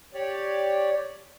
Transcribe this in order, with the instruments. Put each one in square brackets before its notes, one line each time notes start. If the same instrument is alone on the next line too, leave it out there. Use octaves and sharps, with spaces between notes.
[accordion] G4 C#5 D5